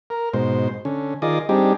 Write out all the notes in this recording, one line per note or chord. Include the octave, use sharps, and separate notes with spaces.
A#4
G#2 B2 C5
D3 C#4
D#3 F4 G#4 D5 D#5
G3 C4 D4 D#4 G4 G#4